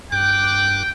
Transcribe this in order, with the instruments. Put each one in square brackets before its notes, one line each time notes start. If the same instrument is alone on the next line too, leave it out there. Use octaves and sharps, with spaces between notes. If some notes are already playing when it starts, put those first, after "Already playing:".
[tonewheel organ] G2 D6 F#6 [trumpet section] G5